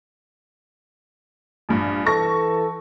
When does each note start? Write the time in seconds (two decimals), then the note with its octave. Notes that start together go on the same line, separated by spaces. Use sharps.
1.69 A#1 G2
2.06 E3 A4 C#6 A#6